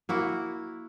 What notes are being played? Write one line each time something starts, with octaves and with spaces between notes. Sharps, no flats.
A#3 E4 F#4